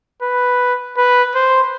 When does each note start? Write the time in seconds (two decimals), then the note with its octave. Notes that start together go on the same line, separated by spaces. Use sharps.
0.22 B4
0.97 B4
1.35 C5